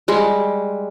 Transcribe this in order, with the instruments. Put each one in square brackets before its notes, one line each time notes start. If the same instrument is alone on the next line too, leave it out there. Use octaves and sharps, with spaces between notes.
[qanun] G3 G#3